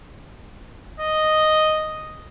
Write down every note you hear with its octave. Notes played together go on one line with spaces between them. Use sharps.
D#5